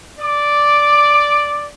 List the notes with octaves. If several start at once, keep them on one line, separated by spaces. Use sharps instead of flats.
D5 D6